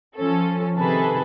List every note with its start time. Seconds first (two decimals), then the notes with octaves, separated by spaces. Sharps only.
0.16 F3 C#4 A4
0.77 C3 D#3 G#4 A4 B4